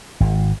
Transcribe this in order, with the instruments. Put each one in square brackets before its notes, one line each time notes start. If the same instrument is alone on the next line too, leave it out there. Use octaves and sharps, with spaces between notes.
[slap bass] G#1